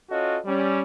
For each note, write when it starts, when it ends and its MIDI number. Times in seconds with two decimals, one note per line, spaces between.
0.10 0.38 61
0.10 0.38 65
0.10 0.38 66
0.10 0.38 69
0.10 0.38 73
0.10 0.38 75
0.46 0.81 55
0.46 0.81 61